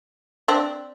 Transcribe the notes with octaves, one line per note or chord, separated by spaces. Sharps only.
C4 D4